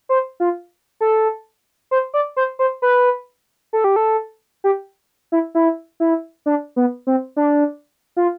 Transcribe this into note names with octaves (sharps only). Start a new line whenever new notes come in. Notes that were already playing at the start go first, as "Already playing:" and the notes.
C5
F4
A4
C5
D5
C5
C5
B4
A4
G4
A4
G4
E4
E4
E4
D4
B3
C4
D4
F4